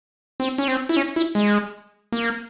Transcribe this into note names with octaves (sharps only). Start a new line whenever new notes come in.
C4
C#4
C4
E4
C#4
E4
G#3
A#3